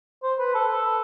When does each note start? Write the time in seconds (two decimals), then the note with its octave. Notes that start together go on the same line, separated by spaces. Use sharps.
0.23 C5
0.39 B4
0.55 A4